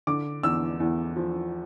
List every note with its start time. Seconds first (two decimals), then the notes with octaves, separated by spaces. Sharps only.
0.07 D3 D6
0.43 E2 E6
0.80 E2
1.16 F3